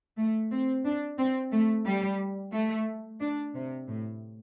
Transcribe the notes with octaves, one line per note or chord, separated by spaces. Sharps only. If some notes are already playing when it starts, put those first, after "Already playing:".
A3
C4
D4
C4
A3
G3
A3
D4
C3
A2